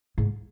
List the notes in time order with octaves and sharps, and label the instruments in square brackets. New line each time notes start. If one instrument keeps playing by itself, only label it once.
[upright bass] G#2